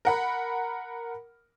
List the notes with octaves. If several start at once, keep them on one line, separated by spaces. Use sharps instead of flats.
A#4 F#5 B5